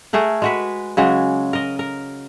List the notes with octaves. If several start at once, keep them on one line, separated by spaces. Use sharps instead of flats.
A3 G#4 A#4 F#5
G#3 F#4 B4
C#3 F#3 G#3
A#4 D#5
A#4